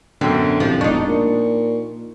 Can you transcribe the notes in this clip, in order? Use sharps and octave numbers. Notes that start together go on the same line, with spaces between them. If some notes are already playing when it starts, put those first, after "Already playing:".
F#2 B2 D3 C4
C2 F3
E1 D4 D#4 C#6
A#2